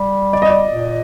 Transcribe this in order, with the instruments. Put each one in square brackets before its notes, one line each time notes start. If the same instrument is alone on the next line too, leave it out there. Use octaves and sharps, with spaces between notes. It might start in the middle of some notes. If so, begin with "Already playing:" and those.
Already playing: [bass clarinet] G3
[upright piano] D5
D#5
D5
[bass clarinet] A#2